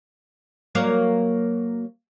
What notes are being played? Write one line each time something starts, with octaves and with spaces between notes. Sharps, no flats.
F#3 A#3 C#5